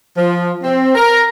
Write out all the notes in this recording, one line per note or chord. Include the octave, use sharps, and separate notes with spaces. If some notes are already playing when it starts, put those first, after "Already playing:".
F3
C4
A#4